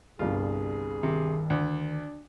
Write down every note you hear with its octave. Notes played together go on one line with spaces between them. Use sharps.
G1 C2 G2 F4 G#4
C3 D#3
D2 D4